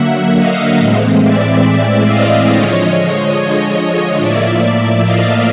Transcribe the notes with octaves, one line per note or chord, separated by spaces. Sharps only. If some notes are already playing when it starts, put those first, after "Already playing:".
Already playing: D3 F#3 A#3 E5 F#5
D#5 F5
A2 E3 G#3 C4
D5 E5
D#5 F5
D3 F3 G#3 C#5 D#5
A2 F3 A#3 D5 E5
D#5 F5